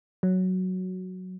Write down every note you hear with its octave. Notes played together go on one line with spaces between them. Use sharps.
F#3